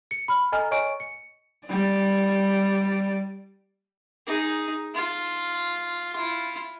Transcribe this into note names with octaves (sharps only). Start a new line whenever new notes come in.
C#7
B5 F6
A4 D#5 G#5 A#5 F6
C#5 D#5 G#5 C#6 D7
C#7
G3 D5
D#4 G#4
F4
E4 F4